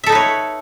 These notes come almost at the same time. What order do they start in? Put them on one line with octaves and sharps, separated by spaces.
E5 A4 D#4 B4 C#5